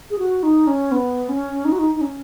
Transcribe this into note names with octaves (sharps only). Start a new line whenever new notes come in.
G#4
F#4
D#4
C#4
B3
C#4
D#4
F#4
D#4
D#4
C#4